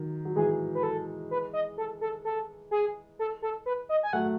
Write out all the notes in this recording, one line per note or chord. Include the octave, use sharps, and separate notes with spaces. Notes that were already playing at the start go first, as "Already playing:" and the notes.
Already playing: D#3 F#3
F#3
E3 G#3 G#4
B4
A4
B4
D#5
A4
A4
A4
G#4
A4
A4
B4
D#5
G#5
F#3 A3 F#5